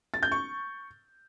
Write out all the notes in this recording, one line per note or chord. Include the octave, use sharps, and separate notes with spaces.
A6
G6
C#6